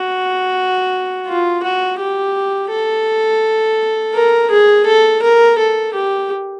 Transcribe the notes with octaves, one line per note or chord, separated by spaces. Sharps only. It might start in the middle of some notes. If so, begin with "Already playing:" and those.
Already playing: F#4
F4
F#4
G4
A4
A#4
G#4
A4
A#4
A4
G4